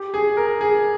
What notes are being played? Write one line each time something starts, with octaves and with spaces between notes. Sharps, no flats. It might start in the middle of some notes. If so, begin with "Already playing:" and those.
Already playing: G4
G#4
A#4
G#4